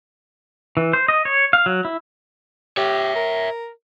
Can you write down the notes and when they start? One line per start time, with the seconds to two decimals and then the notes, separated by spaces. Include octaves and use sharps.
0.77 E3
0.93 C5
1.08 D#5
1.25 C#5
1.53 F5
1.66 F#3
1.85 E4
2.77 G4 C#5 E5
3.16 A#4